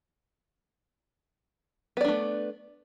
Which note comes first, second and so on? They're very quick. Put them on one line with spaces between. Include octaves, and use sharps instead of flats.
B3 D5 D4 A3